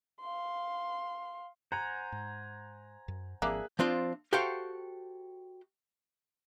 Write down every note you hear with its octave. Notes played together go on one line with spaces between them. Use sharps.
F5 C6
C5 F#5 G#5 A#5
G#2
F#2
G#1 F3 A#3 C4 D4 G#4 E5 F#6
F3 C4 D4 F4
F#4 G4 A4 C5 F5 G5